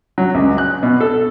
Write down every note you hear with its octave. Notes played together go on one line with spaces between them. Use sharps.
F#3
C#2
F#6
B2
A4